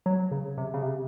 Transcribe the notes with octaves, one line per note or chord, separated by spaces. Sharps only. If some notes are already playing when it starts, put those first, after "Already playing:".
F#3
C#3
C3
C#3
C3